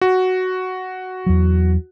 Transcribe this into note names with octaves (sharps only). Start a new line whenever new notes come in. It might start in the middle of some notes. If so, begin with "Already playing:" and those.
F#4
E2 F#3